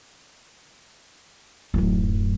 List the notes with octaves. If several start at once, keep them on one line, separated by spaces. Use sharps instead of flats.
D1 F#2